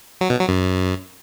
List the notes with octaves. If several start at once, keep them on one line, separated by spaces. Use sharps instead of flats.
F#3
B2
F#3
F#2